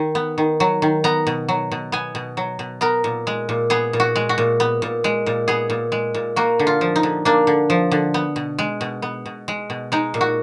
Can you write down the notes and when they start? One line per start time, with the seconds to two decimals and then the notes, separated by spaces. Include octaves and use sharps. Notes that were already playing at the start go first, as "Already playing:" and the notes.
Already playing: D#3
0.15 B3
0.38 D#3
0.60 F#3
0.82 D#3
1.04 B3 A#5
1.27 B2
1.49 F#3
1.72 B2
1.92 B3 G#5
2.15 B2
2.37 F#3
2.59 B2
2.81 B3 A#4
3.04 A#2
3.27 G#3
3.49 A#2
3.70 B3 G#4
3.93 A#2
4.00 F#4
4.16 G#3
4.29 F#4
4.38 A#2
4.60 B3
4.82 A#2
5.04 G#3
5.26 A#2
5.48 B3 G#4
5.70 A#2
5.92 G#3
6.15 A#2
6.36 A#3 F#4
6.59 D3
6.67 F4
6.81 F3
6.96 D#4
7.03 D3
7.25 A#3 D4
7.47 D3
7.70 F3
7.91 D3
8.14 B3
8.36 B2
8.59 G#3
8.81 B2
9.02 B3
9.26 B2
9.48 G#3
9.70 B2
9.92 G#3 D#4
10.14 A#2
10.21 F#4